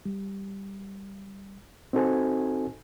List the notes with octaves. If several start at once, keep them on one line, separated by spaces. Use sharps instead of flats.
G3
C4 D#4 F#4 A4 C5 G#5